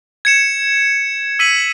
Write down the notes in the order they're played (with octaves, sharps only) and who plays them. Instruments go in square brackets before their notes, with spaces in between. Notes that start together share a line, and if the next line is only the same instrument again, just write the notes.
[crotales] G#6 C#7 E7
E6 B6 D#7 F#7